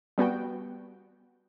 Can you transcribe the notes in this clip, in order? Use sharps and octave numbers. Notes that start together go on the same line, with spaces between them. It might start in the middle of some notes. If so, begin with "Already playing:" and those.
G3 B3 F#4 G5